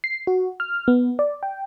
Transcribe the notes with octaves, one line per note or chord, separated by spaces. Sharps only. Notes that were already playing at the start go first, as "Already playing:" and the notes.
C7
F#4
F6
B3
D5
G5